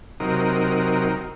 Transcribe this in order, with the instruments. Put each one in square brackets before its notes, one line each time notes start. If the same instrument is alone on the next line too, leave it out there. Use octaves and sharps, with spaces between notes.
[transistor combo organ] C3 F#3 D#4 A#4